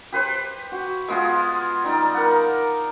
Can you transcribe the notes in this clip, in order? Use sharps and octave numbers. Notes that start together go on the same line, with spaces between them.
G4 B4 C5
F#4
G#3 B3 F4 G#4
G3 D#4 D5
A#4 F#5